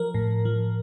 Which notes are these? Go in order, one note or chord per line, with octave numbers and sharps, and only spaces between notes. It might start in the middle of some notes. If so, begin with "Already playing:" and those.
Already playing: F3 A#4
A2
F3